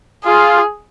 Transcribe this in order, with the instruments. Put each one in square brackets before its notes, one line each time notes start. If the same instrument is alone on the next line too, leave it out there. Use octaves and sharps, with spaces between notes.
[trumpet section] F4 [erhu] G#4